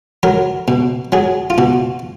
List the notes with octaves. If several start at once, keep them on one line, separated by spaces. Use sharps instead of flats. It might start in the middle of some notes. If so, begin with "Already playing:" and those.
F#3 A#4
B2
F#3 G#4
F4
B2 F#4